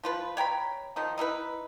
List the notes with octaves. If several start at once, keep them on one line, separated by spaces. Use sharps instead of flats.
F3 F4 B4
C#5 G5 A#5 B5
D#3 F3 D#4
D#4 E4 A#4 B4